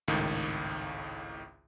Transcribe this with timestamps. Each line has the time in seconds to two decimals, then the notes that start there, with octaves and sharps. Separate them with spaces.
0.08 G#1 C#2 A2 D#3